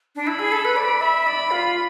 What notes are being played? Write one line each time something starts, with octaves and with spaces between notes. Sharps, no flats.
D4
E4 B5
G#4
A4
B4
D5
E5
D5 B5
F4